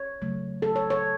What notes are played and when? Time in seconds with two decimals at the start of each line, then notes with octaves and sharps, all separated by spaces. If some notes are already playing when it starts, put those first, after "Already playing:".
Already playing: C#5
0.22 C#3 F#3 A3
0.62 A4
0.76 C#5
0.90 C#5